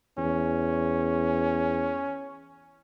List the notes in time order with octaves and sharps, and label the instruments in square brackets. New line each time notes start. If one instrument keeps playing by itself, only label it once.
[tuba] E2 [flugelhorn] C#4